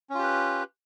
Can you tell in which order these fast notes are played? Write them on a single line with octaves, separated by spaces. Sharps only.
C#4 F4 G4 B4